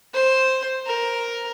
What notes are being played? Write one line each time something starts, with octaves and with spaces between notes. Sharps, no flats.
C5
A#4